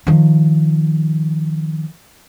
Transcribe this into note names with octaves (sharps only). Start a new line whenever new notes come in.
D#3 F3